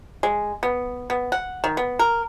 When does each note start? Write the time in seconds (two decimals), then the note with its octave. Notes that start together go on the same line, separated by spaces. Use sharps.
0.23 G#3
0.63 B3
1.10 B3
1.32 F#5
1.64 D#3
1.77 B3
1.99 A#4